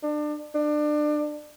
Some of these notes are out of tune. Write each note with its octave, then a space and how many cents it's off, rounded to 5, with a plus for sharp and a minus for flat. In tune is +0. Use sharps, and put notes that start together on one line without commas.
D4 +30
D4 +25